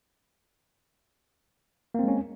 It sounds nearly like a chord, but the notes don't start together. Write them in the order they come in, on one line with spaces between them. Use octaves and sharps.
A#3 C4 G#3 C#4